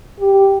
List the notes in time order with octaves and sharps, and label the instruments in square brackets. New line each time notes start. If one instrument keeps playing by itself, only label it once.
[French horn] G4